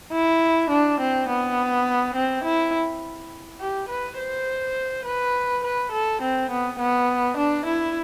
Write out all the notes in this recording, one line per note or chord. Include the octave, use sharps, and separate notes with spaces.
E4
D4
C4
B3
C4
E4
G4
B4
C5
B4
B4
A4
C4
B3
B3
D4
E4